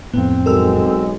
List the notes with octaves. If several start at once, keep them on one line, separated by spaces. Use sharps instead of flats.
F2 A2 B3 C4
B1 F#3 G#3 A4 A#4 E6